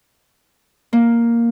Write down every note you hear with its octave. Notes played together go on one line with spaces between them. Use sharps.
A#3